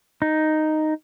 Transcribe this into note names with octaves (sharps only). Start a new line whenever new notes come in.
D#4